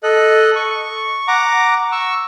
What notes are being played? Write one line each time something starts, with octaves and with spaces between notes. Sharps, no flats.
A4 D#5 F#6
C#6
F#5 A#5 D6
C#6 E6